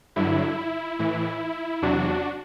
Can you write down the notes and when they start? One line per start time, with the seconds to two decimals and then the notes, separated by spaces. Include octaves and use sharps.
0.16 G2 D3 F#3 E4
0.99 A2 E3 E4
1.82 E2 C3 F#3 D4 F#4